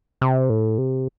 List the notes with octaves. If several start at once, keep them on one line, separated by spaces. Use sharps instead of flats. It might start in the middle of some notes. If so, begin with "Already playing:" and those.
C3
A2
C3